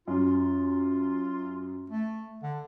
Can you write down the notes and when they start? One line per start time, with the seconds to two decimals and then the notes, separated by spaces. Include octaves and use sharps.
0.07 F#2 F4
1.90 A3
2.43 D3